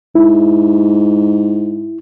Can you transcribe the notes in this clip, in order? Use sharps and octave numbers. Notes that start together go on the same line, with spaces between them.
G#2 E4